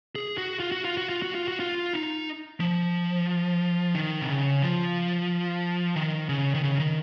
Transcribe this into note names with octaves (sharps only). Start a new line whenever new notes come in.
G#4
F#4
F4
F#4
F4
F#4
F4
F#4
F4
F#4
F4
D#4
F3
D#3
C3
C#3
F3
D#3
C#3
D#3
C#3
D#3